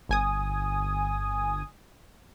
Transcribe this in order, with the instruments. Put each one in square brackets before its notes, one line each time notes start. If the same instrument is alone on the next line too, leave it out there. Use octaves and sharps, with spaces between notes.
[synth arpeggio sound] G1 G#5 D#6